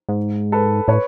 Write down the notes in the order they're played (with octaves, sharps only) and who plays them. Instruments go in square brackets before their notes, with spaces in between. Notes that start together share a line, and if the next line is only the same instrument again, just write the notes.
[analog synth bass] G#2
[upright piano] A4 B4
[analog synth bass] A2 [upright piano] B4 C#5